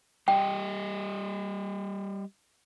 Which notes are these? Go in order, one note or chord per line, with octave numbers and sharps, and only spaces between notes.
G3 G4 D#5 G5